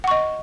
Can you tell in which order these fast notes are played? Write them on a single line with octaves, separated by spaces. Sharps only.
F#5 C#6 D#5